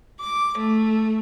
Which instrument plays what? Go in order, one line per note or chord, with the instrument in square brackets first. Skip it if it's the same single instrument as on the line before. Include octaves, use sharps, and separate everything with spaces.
[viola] D6
A3